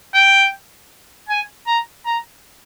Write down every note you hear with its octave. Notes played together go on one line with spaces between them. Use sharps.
G5
G#5
A#5
A#5